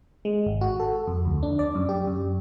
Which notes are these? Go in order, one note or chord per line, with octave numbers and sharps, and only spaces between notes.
G#3
G#1
F#4
A4
F2
D2
D4
D5
F#2
G4
F#2